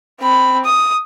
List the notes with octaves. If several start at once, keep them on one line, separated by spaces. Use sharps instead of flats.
C4 B5
D#6